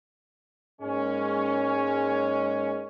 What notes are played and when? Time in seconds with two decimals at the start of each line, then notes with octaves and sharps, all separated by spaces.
0.81 G#2 G#3 A#3 C#4